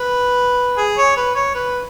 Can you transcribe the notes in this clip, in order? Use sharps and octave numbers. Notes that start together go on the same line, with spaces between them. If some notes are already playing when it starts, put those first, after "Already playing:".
Already playing: B4
G#4
C#5
B4
C#5
B4